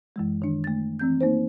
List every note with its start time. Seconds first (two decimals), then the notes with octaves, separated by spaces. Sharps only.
0.16 F#2 E3 G#3
0.42 D#3 D4
0.64 A3 A6
0.99 E3 C4 G6
1.21 A#3 D#4 C5